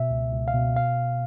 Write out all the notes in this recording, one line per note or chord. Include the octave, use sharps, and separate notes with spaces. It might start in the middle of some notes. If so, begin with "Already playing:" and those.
Already playing: B2 E5
C#2
C#2
F5
B2
F5